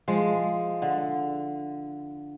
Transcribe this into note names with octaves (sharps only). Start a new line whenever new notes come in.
F3 G#3
D3